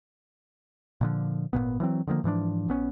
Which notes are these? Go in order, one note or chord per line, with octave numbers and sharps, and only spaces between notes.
A#2 D3 F3
G#1 F#2 A#2 B3
E3 F#3 C4
D3 D#3 F3 A#3
G#2 E3 F3 D4
A#1 B3 C#4